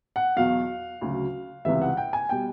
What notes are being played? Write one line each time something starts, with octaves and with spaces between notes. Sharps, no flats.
F#5
E2 B2 F#3 F5
D2 C#3 F#3
C#2 C3 E3 G3 E5
F#5
G5
G#5
B2 G3 G5